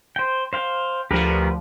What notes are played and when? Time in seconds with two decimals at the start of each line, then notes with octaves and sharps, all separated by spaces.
0.16 C5 G5
0.53 C5 F5 G5
1.11 D2 F3 G4 A#4 B4